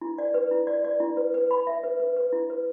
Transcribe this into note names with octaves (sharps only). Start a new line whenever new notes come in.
E4
D5
B4
E4
D5
D5
E4
B4
B4
B5
E5
B4
B4
B4
E4
B4